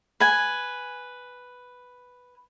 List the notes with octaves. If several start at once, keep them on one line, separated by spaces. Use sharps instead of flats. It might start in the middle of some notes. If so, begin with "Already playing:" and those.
B4 G#5